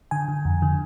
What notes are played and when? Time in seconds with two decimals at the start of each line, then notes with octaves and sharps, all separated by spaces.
0.11 D3 G#5
0.28 D3
0.45 F2
0.62 D3